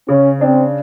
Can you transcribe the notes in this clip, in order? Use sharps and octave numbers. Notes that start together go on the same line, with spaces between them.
C#3 C#4
C4 D4